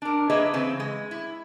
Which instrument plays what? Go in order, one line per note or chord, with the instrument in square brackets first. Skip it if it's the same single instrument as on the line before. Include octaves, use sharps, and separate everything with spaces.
[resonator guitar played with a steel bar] D4 A#4
A#3 G#4 B4 C#5 D#5 E5
C#3 E3 C4 B4
G#3
E4